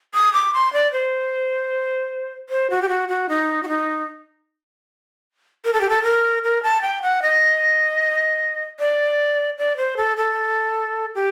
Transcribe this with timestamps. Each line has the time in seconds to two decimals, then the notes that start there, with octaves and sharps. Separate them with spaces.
0.14 D#6
0.33 D6
0.54 C6
0.73 D5
0.92 C5
2.49 C5
2.70 F#4
2.82 G4
2.89 F#4
3.09 F#4
3.29 D#4
3.63 F#4
3.68 D#4
5.65 A#4
5.73 A4
5.81 G4
5.89 A4
6.03 A#4
6.44 A#4
6.63 A5
6.82 G5
7.02 F#5
7.22 D#5
8.79 D5
9.58 D5
9.77 C5
9.97 A4
10.17 A4
11.15 G4